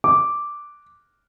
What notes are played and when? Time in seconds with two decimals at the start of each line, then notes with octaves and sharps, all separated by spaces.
0.04 D6